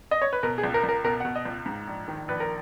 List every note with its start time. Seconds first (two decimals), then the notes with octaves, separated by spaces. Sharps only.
0.11 D#5
0.22 C#5
0.33 B4
0.43 B2 A#4
0.58 G#4
0.64 C#2
0.74 A#4
0.84 C#2
0.89 A#4
1.04 B2 A#4
1.20 F#5
1.25 B2
1.35 D#5
1.45 C#2
1.66 G#2
1.87 A#1
2.08 D#3
2.28 A#1 B4
2.40 A#4